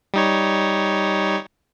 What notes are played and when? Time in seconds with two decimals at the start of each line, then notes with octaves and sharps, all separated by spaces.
0.14 G3 D#4 C#5